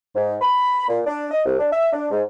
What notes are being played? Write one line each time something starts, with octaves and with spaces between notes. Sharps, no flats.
G#2
B5
A#2
D4
D#5
C2
D4
E5
D4
G#2